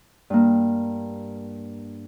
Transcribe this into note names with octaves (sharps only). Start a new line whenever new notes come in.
G2 A#3